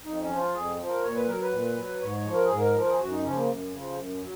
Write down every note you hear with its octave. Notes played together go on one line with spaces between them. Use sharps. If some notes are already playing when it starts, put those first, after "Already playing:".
F2 D#4
C#4
F3
F4
F2 G#4
F3
A#4
A#2 C#5
B4
F#3 A#4
B4
A#2
F#3
G#2 C#5
C#5
F3
A#4
G#4
G#2
A#4
F3
A#4
G#4
F#2 F#4
D#4
C#3 F3 C#4
A#3
F#2
C#3 F3
F#2
F#3